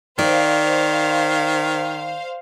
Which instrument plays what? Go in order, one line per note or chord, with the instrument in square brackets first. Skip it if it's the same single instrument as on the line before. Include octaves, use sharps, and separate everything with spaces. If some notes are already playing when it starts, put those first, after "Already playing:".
[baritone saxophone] D#3 [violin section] C5 F5 [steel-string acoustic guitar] D5